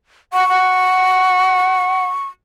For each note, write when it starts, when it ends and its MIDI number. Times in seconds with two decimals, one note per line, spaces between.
0.33 0.47 78
0.33 2.27 85
0.49 2.04 78